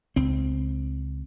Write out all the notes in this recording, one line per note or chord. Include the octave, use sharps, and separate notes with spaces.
C#2 C4